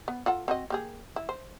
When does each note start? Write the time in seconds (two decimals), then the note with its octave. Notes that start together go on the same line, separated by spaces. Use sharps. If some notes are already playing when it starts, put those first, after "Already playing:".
0.08 B3
0.26 F4 A4 F#5
0.48 C4 F#4 D#5
0.70 A#3 G4 G#4
1.16 E4
1.29 C5